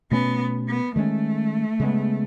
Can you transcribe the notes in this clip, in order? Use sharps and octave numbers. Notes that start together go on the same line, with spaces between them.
B2 A3 B3 C#4
B3
D#3 G#3 A3 C#4
C#3 G#3 B3